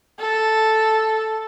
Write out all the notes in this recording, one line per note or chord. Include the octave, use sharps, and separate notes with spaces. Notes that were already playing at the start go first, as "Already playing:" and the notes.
A4